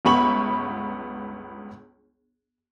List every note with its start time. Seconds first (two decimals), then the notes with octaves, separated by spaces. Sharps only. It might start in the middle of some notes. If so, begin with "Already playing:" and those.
0.05 G1 C#2 B3 B5 C#6 F#7